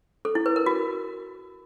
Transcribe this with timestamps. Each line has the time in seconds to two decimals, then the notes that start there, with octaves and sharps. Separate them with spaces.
0.25 A4
0.35 E4
0.46 B4
0.56 A#4
0.66 F#4